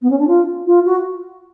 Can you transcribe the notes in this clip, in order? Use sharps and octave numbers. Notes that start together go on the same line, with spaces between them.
B3
C#4
D4
F4
F4
F#4